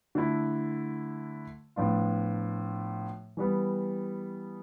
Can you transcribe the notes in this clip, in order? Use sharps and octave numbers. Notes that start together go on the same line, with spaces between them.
D3 A3 E4
A2 F3 B3 D4 F4
E3 G3 B3